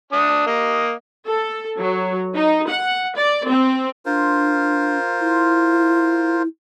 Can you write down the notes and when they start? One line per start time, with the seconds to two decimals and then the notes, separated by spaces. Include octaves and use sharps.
0.13 D4 D#6
0.47 A#3 D#5
1.26 A4
1.78 F#3
2.34 D#4
2.67 F#5
3.15 D5
3.48 C4
4.06 D4 F4 A#4 C5
5.20 E4